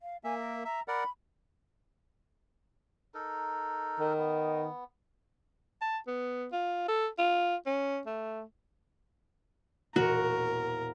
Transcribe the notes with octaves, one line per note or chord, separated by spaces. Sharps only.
F5
A#3 E5 G#5
A#4
E5 A#5
A#4 D5 F#5 B5
D#4 A4 A#4
D#3
B3
A5
B3
F4
A4
F4
C#4
A3
E1 A#2 F#4 A#4